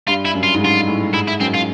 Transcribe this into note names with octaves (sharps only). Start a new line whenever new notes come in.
G2 F4
E4
F#2
F4
G#2
G2 F4
A2
G#2 E4
E4
F#2 C4
F4